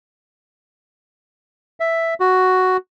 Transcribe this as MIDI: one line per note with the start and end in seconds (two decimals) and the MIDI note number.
1.80 2.14 76
2.20 2.77 66